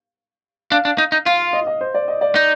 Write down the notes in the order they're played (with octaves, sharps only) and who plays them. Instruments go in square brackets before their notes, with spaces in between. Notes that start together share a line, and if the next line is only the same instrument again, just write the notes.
[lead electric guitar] D4 [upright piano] F5
[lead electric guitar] D4
D#4
D#4
[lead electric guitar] F4 [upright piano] F5
[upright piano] D#5
D#5
C5
D5
D#5
D5
[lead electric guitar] D#4